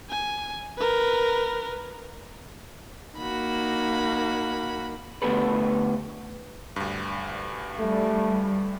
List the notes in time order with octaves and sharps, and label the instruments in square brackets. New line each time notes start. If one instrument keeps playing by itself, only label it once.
[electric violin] G#5
A#4 B4
[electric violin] A#3 D#4 [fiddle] F#4 B5
[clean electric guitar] D3 A3 B3 G4 A4 B4
[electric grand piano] D2 G2
[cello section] G3 [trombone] A3